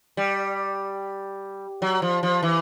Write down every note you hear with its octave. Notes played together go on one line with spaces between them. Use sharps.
G3
F#3
F3
F3
E3